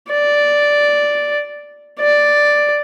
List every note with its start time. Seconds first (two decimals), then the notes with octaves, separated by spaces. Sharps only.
0.11 D5
2.00 D5